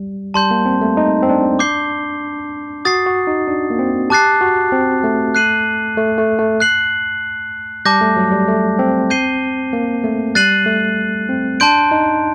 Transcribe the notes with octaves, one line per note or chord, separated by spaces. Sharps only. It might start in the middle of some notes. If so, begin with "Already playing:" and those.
Already playing: G3
G3 A5 C6 G6
A#3
C4
A3
D#4
C4
D4
D6 G6 C7 G7
F#4 D#6 A6 C7
F#4
D#4
D4
A#3
C4
G4 A5 D6 F#6 A6 C7
F#4
C4
A3
F#6 C7 D#7 F#7
A3
A3
A3
F#6 C7 F#7
G3 A5 D6 G6 A#6
A3
F#3
G3
A3
C4
G6 C7 D#7 G7
A#3
A3
G3 F#6 A6 C7 D#7 F#7
A3
C4
D4 A5 C6 G6 D7
D#4